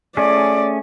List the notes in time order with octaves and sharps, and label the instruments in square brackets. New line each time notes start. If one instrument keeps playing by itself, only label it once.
[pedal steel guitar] A3 C#4 G#4 [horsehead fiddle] D5